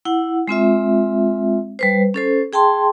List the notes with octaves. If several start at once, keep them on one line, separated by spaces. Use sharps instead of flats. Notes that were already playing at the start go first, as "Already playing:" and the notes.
E4 F#5
G#3 C4 F4 E5
G3 B4 C5
C#4 A4 C5
G#4 G5 A5 C6